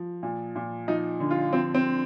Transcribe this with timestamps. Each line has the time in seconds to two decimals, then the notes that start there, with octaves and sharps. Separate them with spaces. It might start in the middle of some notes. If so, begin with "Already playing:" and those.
Already playing: F3
0.23 A#2
0.56 A#2
0.88 F3 D#4
1.20 D3
1.31 F4
1.53 F3 C4
1.75 C4